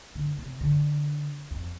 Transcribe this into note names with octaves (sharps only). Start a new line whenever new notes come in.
D3
C3
D3
F2